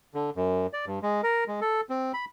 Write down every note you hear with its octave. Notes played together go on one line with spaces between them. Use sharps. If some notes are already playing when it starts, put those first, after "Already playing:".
D3
F#2
D5
G2
G#3
A#4
G#3
A4
C4
B5